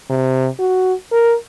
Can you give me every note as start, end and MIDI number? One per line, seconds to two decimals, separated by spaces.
0.10 0.48 48
0.59 0.93 66
1.12 1.35 70